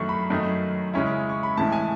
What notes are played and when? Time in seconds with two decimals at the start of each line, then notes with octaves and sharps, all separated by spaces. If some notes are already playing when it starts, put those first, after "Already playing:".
Already playing: F#2 D#3 A3 E4 C#6
0.09 B5
0.30 F#2 D#3 A3 D#4
0.94 C#3 G#3 C#4 E4
1.30 C#6
1.43 B5
1.57 A2 E3 G#3 C#4 E4 A5
1.72 G#5